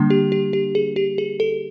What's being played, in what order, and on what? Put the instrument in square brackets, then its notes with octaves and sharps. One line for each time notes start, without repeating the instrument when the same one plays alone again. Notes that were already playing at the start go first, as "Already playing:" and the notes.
Already playing: [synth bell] D3 G3 A#3 D4
G4
G4
G4
G#4
G4
G#4
A4